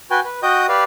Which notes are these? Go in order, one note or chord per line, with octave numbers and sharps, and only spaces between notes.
F#4 B4 G5 G#5
B4
F#4 D#5 G5 D#6 G6
G4 B4 D5 F5